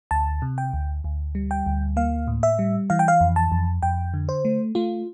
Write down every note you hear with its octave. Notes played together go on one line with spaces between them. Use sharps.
D2 A5
C3
G5
D2
D2
G3
G5
D2
A#3 F5
A2
E5
G3
E3 F5
G5
F5
F2
A5
F2
F2 G5
D3
C5
A3
A3 F4